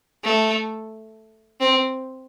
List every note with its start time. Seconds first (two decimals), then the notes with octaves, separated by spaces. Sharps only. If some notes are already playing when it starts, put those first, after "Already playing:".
0.24 A3
1.60 C4